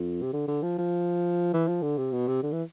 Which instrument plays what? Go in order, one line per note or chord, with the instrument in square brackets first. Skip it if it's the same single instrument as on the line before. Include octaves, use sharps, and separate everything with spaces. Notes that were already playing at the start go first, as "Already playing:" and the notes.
Already playing: [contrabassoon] F2
C3
D3
D3
F3
F3
E3
F3
D3
C3
B2
C3
D3
E3